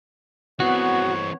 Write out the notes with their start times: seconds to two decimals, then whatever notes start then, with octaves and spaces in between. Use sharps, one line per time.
0.60 E3 B3 C4 F#4 C#5